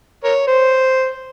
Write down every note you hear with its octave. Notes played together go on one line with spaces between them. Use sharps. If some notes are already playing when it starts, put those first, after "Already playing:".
A#4 C#5
C5